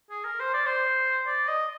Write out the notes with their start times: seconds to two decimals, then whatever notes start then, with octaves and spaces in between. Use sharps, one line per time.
0.10 G#4
0.24 A#4
0.39 C5
0.53 D5
0.66 C5
1.27 D5
1.48 D#5